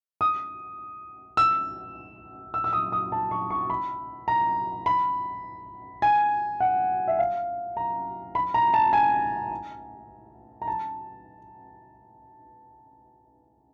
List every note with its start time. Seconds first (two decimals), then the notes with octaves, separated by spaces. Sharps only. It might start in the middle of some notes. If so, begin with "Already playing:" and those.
0.21 D#6
1.37 E6
2.54 E6
2.64 E6
2.73 D#6
2.92 D#6
3.12 A5
3.31 C#6
3.50 C#6
3.70 B5
4.28 A#5
4.86 B5
6.02 G#5
6.60 F#5
7.08 E5
7.19 F5
7.77 A#5
8.35 B5
8.54 A#5
8.74 A5
8.93 G#5
10.62 A#5
10.67 A5